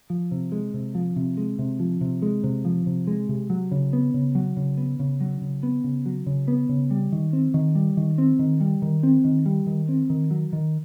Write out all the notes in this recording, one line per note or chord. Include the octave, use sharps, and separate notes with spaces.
F3
C3
G#3
C3
F3
C3
G#3
C3
F3
C3
G#3
C3
F3
C3
G#3
C3
F#3
C#3
B3
C#3
F#3
C#3
B3
C#3
F#3
C#3
B3
C#3
F#3
C#3
B3
C#3
G3
D#3
C4
D#3
G3
D#3
C4
D#3
G3
D#3
C4
D#3
G3
D#3
C4
D#3
F#3
D#3